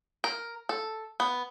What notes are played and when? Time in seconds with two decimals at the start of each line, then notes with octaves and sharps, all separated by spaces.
0.24 A#4
0.69 A4
1.20 B3